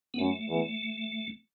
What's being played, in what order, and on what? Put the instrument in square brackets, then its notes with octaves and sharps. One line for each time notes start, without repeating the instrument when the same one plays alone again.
[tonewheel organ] B3
[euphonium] F#2 [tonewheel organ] A3
[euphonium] E2